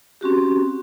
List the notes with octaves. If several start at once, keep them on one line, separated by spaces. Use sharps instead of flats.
C4 C#4 F#4 G4